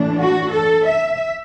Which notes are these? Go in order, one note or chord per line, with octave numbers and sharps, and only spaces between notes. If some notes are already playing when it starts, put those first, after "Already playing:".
Already playing: A2 E3 A3 D4
F#4
A4
E5